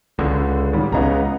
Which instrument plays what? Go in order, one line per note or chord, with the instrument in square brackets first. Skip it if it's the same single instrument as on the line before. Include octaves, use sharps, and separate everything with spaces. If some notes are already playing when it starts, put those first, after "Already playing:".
[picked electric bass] C#2 [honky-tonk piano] D3
[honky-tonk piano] A1 D#3 G3
[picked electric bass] C#2 C#3 [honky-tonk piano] B3 D#5 A#5